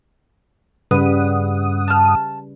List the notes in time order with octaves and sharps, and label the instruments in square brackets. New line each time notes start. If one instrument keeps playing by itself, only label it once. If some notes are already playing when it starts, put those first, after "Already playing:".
[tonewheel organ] G2 F#5 D#6 [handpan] C#3 G3 B4
[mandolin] A5 F6